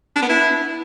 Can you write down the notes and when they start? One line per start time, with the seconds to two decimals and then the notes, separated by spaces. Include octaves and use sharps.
0.16 D4
0.22 B3
0.29 E4